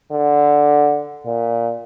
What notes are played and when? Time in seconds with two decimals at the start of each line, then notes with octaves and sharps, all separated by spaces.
0.12 D3
1.26 A#2